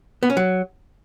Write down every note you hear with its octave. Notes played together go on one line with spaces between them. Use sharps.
B3
C#4
F#3